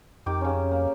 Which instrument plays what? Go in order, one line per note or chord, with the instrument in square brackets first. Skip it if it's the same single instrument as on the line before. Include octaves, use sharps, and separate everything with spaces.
[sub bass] F2 [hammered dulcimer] D#3 G4 D6
[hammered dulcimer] C#3 C#4
A#3